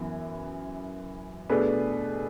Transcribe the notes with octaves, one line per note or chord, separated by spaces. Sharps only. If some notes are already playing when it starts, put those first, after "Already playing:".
Already playing: F#2 E3 B3
B2 A3 D4 G#4 B4